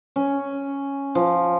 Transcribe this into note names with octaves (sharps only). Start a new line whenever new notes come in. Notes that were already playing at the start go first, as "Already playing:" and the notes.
C#4
F3